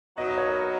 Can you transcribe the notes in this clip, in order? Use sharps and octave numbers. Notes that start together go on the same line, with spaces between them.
F#3 B3 D#4 D#5
D#5
C#5
A#4